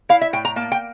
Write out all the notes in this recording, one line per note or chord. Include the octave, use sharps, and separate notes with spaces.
E4 F5
E5
A2 G5
A#5
A#3 A5
G5